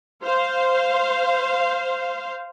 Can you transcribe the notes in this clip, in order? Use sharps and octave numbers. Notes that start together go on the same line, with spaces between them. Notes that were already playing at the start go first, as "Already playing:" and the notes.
C5 F5